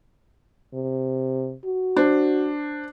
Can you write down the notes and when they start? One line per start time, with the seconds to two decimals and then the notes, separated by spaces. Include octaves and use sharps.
0.74 C3
1.65 F#4
1.97 D4 C5